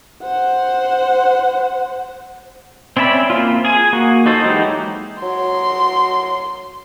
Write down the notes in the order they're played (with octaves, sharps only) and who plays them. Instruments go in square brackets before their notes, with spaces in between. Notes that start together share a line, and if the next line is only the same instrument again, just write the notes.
[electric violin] C5 F#5
[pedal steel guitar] C4 C#4 D5 E5 B5
A#3 C4 F4
G#4 G#5
A#3 F#4
D#4 F#4 A4 C5
E3 F#3 G#3 D#4 G4
[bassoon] F#3 [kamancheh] C6